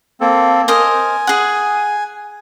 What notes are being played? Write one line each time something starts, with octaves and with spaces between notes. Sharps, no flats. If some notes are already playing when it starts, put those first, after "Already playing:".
A#3 C4 A4
A#4 C5 D#5 G#5
G#4 F#5